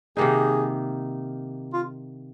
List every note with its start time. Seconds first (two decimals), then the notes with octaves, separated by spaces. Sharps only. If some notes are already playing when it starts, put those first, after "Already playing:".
0.17 C3 D#3 A#3 D#4 G#4
1.73 F4